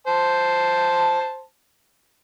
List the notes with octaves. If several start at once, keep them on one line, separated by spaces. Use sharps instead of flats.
C5 A5